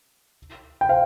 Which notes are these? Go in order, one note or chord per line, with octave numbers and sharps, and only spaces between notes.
G5
C5 F5